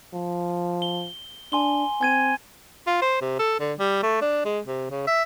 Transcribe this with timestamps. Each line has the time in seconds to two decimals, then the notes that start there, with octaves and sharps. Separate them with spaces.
0.13 F3
0.82 G7
1.52 D4 G#5 C6 G7
2.01 C4 G#5 G#6 D#7
2.87 F4
3.02 C5
3.21 C3
3.39 A4
3.60 D3
3.79 G3
4.03 A3
4.22 D4
4.45 G#3
4.65 C3
4.91 C#3
5.07 E5